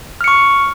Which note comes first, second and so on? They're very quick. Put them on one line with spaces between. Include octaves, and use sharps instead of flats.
F6 C#7 C#6